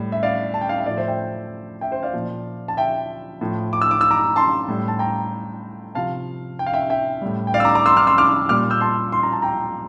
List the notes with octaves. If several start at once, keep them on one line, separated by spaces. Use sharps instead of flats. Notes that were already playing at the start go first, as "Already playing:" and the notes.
Already playing: A2 G3
E5
D5 F5
A5
G5
F5
E5
A2 F3 D5
C5 E5
E5 G5
E5 G5
C5
D5 F5
A#2 F3
A5
E5 G5
A2 F3
D6
E6
D6
E6
A#5 D6
A5 C6
A2 G3
A5
G5 A#5
C3 F3 F5 A5
G5
F5
E5 G5
E5 G5
A2 G3
G5
D5 F5
E6
A#5 D6
A#5 D6
C6 E6
D6 F6
C6 E6
D6 F6
A#2 G3 D6 F6
E6 G6
A5 C6
C6
A#5
A5
G5 A#5